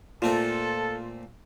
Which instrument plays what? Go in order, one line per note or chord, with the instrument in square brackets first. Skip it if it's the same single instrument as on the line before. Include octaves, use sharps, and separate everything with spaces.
[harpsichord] A#2 A3 C4 [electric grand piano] F4 [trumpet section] A4